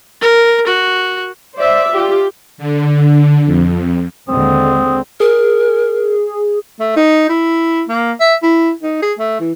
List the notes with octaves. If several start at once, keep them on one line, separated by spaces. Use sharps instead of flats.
A#4
F#4
C5 D5 E5
F4 G4
D3
F2
D#2 D3 G#3 C4 D#6
G#4 A#4
A3
D#4
E4
A#3
E5
E4
D#4
G#4
A3
E3